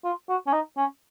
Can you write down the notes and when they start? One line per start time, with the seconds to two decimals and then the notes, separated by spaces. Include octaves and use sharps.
0.05 F4
0.29 F#4
0.47 C#4
0.53 D#4
0.77 C#4